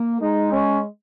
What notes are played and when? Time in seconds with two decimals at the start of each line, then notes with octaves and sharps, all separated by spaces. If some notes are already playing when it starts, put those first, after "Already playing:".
Already playing: A#3
0.21 G#3 D#4
0.52 C#4